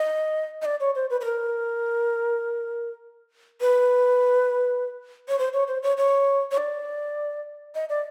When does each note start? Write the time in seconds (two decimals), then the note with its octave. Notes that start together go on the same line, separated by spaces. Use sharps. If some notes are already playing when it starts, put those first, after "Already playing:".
Already playing: D#5
0.62 D#5
0.65 D5
0.80 C#5
0.95 C5
1.10 B4
1.21 B4
1.25 A#4
3.61 B4
5.29 C#5
5.39 C5
5.53 C#5
5.68 C5
5.83 C#5
5.97 C#5
6.51 C#5
6.58 D5
7.75 D#5
7.89 D5